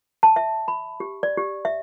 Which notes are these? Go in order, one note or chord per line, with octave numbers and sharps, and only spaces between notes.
A5
E5
B5
G4
D5
G4
E5